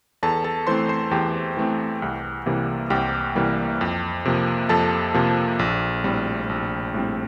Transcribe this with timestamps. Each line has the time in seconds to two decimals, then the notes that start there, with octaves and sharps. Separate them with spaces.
0.23 E2 A4 A5
0.44 A4 A5
0.67 E3 A3 C4 C5 C6
0.89 C5 C6
1.11 E2 G4 G5
1.57 E3 A3 C4
2.02 C2
2.46 C3 E3 G3 A#3
2.90 C2 G4 G5
3.35 C3 E3 G3 A#3
3.81 F2
4.25 C3 F3 A#3
4.69 F2 A4 A5
5.14 C3 F3 A#3
5.59 A#1
6.04 A2 G3 C4
6.49 A#1
6.94 A2 G3 C4